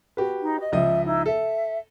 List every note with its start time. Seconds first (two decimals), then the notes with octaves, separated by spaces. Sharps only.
0.17 F#4 G4 B4
0.41 D#4
0.58 D#5
0.72 C#2 F3 D#5 E5
1.04 D#4 E4
1.26 A4 E5